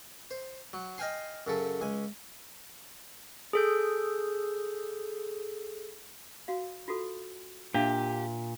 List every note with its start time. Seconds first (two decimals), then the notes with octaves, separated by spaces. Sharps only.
0.31 C5
0.73 F#3
0.98 D#5 F5 G5 G#5 C6
1.47 F#2 C#3 A4
1.81 C#2 G#5
3.53 G#4 A4 G6
6.48 F#4 F5
6.88 F4 F#4 A4
7.74 A#2 D4 G4 E5 F5